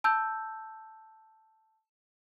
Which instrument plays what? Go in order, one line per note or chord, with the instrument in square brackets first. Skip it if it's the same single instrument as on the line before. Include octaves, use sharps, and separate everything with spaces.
[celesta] A5 E6 G6